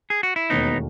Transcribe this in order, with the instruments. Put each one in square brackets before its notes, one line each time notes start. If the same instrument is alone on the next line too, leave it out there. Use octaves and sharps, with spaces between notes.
[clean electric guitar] G#4
F#4
E4
[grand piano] E1 D#2 D#3 A3 C#4 [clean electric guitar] B3 D#4